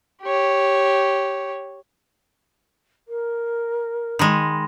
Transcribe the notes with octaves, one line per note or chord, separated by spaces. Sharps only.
G4 C#5
A#4
D#3 G#3 B5 C6 A#6